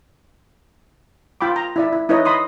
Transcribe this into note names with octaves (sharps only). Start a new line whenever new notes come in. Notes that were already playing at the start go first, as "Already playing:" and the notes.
F4 G5 B5 D6
A#5
E4 D5 E5
E4
D#4 E4 B4 C#5 D#5
D#5 B5 C6 D#6